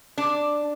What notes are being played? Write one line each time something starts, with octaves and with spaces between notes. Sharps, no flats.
D4